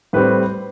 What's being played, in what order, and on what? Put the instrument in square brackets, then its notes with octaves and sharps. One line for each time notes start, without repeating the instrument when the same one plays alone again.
[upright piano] A2 G3 C4 B4